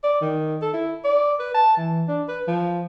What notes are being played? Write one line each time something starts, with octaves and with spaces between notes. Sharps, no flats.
D5
D#3
A4
E4
D5
B4
A5
E3
D4
B4
F3